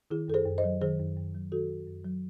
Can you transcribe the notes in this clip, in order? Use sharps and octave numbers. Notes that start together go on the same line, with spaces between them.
D#3 E4 G#4
F#2 A4
G#4 C5
F#2
C5 D#5
F#3
D#3 G#4 C5
F#2
F#2
F#3
D#3 F#4 A4
F#2
F#2
F#3